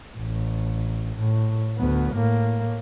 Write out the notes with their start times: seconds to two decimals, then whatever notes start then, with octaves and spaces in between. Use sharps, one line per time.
0.17 A1
1.19 A2
1.78 D2 B3
2.13 A2 A#3